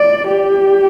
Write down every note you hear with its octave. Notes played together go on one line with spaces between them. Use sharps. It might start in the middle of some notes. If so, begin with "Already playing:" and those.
Already playing: D5
G4